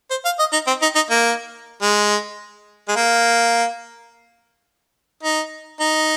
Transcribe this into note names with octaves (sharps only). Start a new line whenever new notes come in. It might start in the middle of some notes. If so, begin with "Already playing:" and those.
C5
F5
D#5
D#4
C4
D#4
D#4
A#3
G#3
G#3
A#3
D#4
D#4